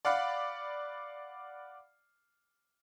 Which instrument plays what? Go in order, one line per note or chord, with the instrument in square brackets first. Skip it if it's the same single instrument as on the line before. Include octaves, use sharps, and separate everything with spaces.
[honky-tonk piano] D5 F5 F#5 B5